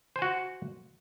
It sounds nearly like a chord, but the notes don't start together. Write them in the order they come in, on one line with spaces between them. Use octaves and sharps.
C5 G#5 F#4